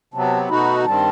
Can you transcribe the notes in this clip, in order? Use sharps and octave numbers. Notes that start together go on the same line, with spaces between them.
C3 F#3 B3 A5
B2 A3 D#4 F#4 B5
G2 D#3 G3 C4 A5